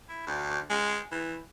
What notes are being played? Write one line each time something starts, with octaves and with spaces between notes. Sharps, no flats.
E4
D2
G#3
E3